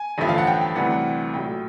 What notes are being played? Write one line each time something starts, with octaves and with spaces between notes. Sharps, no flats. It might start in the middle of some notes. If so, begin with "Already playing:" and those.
Already playing: G#5
A1 G2 D3 F3 E5
F5
F#5
G5
G5
D2 C3 E3 G3 F#5
F#5
A#1 A2 F#3 G5